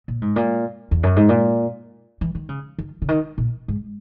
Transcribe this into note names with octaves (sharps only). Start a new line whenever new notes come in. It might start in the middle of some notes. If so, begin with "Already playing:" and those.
A#2
G#2
A#2
E2
F#2
G#2
A#2
E3
D#3
C#3
D#3
C#3
D#3
A#2
G#2